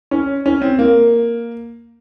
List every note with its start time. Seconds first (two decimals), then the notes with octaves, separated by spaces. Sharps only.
0.11 C#4
0.46 C#4
0.62 C4
0.79 A#3